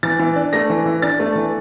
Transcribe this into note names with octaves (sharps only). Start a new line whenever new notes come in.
E3 A6
E3
D4
A3 A#6
E3
E3
D4 A6
A3
E3